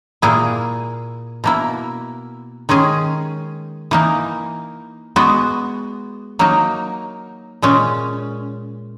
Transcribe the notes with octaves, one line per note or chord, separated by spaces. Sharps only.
A#2 A#3 E4 G#4
B2 A#3 E4
D#3 G#3 C#4 G#4
E3 A#3 D#4
G#3 B3 F#4
F#3 A#3 D#4
A#2 G#3 C#4